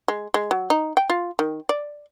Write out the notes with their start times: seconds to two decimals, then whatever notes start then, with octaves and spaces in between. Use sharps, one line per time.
0.08 G#3
0.34 G#3
0.51 F#3
0.70 D#4
0.97 G5
1.10 F4
1.39 D#3
1.69 D5